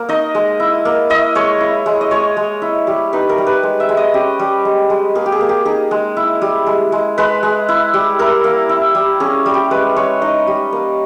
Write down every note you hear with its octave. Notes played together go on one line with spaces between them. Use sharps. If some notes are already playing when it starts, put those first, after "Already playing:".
Already playing: A#3
D#4 D#5
G#3
E4
A#3
E4 D#5
G#3 C#5
E4
G#3
D#5
G#3 C#5
G#3
E4
G3
D#4 B4
A#4
G3
B4
G#3
E5
G#3
D#5
C#4 G4
G3
G#3
G#3
A#3 G#4
G4
G#4
A#3
G4
D#4 G#4
G#3
E4
G3
G#3
G#3
G#3 B4
G#3
E4
G3
E4 A#4
A#3
E4
G3
C#4 G#4
G3
G4
G#3 B4
G#3 C#5
D#4 D#5
G3
A#3